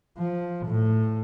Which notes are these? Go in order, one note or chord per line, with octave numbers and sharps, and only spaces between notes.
F3
A2